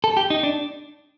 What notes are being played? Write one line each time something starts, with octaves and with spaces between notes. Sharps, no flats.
A4
G4
D#4
D4